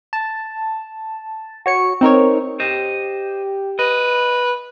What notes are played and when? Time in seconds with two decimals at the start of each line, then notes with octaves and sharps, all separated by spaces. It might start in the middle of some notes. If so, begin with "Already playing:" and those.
0.13 A5
1.66 F#4 C#5 C#7
2.01 C4 D#4 A#4 C#5
2.60 G4 C5 D#5
3.79 B4 D#5